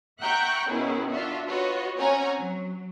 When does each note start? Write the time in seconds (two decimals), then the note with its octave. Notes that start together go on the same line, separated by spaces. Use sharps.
0.21 E5 F#5 G5 A#5 C#6 F#6
0.69 B2 D#3 B3 C#4 E4 G#4
1.10 D4 F4 F#4 E5
1.47 F4 F#4 B4 C#5 D#5
1.97 C4 C#4 C#5 F#5 G#5 A#5
2.38 F#3